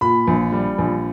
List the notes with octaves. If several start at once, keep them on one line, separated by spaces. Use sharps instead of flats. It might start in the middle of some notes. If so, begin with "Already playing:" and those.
A#2 B5
A#1
G3
A#1